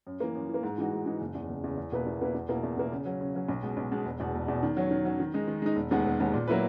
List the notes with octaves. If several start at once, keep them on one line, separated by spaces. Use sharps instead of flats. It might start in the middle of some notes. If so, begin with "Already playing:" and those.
F#2
E3 A#3
F#2
E3
A#3
G#2
E3 G#3 D#4 F#4
G#2
E3 G#3 D#4 F#4
F#1
E2 C#3
F#1
E2 C#3
E2
B2 A#3 E4 B4
E2
B2 A#3 E4 B4
E2
B2 A#3 E4
E2
B2 A#3 E4
C#3
F#3 C#4
C#3
F#3 C#4
B1
B2 G#3
B1
B2 G#3
E1
E2 B2
E1
E2 B2
D#3
F#3 C#4
D#3
F#3 C#4
D#3
G#3 D#4
D#3
G#3 D#4
E1
D#2 D#3 G#3 B3
E1
D#2 D#3 G#3 B3
A#2
F#3 A#3 E4 B4